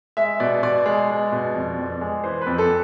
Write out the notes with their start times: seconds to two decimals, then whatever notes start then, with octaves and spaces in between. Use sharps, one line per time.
0.17 G#3 E5
0.40 B2 D5
0.63 B2 D5
0.86 G#3
1.10 G#3
1.32 B2
1.54 F2
1.78 F2
2.01 G#3
2.24 E3 C5
2.41 B4
2.47 F2
2.58 A4